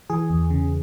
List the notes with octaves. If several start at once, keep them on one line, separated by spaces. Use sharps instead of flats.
E3 G#4
E2
C#3